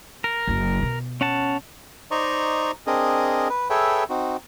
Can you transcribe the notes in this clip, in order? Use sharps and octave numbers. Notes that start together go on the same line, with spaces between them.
A#4
F#1 F#2
B2
C#4 F#5 A5
D#4 C5 D5 D#5 A#5 C#6
C4 D4 G#4 A#4 D#5
B4
G#4 A4 B4 C#5 E5 G5
C4 D#4 F#4